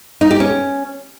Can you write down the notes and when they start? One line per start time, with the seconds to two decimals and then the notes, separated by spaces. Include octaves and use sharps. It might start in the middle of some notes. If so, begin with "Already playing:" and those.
0.21 D#4
0.31 G4
0.40 C#4